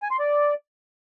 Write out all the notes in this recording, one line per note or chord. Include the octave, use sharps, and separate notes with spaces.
G#5
C6
D5